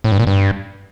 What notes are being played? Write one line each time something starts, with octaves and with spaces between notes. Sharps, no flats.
A2
G2
A#2
G2